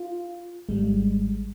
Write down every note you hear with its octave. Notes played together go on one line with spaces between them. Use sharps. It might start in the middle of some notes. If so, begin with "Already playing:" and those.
Already playing: F4
G#1 G#2 G3 G#3